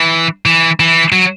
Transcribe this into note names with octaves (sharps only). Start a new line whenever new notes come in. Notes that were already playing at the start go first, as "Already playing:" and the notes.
Already playing: E3
E3
E3
F#3